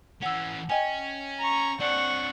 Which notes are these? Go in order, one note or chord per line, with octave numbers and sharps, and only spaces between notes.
E3 C#4 F#5 E6
C#4 D#5 G5 G#5
A#5 C#6
C4 D4 D5 F#5 C#6